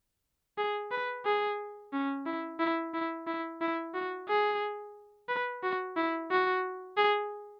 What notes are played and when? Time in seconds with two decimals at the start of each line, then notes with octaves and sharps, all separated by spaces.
0.58 G#4
0.91 B4
1.25 G#4
1.93 C#4
2.26 E4
2.59 E4
2.94 E4
3.27 E4
3.61 E4
3.94 F#4
4.28 G#4
5.29 B4
5.63 F#4
5.96 E4
6.31 F#4
6.97 G#4